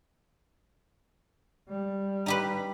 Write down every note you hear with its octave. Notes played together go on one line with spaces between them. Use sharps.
G3
D#4 G4 B4